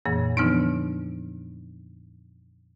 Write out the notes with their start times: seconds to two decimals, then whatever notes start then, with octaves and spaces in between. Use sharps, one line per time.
0.06 F2 A#2 E3 A#3
0.37 D3 E3 F3 B3 D4 D#4